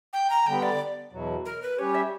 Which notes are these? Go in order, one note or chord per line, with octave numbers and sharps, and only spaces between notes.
G5
A#5
D3 G3 B3 G5
D5
E2 B2 F#3
A#4
B4
G3 C#4 G4 C#5
E5